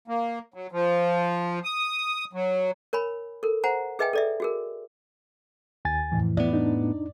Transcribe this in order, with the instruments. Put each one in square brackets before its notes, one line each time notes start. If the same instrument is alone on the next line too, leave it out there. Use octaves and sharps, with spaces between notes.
[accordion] A#3
F#3
F3
D#6
F#3
[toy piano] A#4 C#5 G#5 B5
A4 A#4
C5 F#5 G#5 A#5
G#4 B4 D#5 E5 G5 G#5
A4 D5 E5
F#4 G#4 A#4
[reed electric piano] D#2 G#5 A6
[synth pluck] F2 A2 E3
[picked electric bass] A2 B3 [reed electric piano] E4 [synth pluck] D5
[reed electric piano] D4 D#4